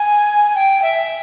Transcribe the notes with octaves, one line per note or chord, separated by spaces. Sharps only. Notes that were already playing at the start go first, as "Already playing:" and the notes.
Already playing: G#5
G5
E5